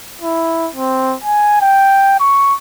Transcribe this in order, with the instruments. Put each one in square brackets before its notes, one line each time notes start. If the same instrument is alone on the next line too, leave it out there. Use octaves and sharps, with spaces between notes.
[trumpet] E4
C4
G#5
G5
C#6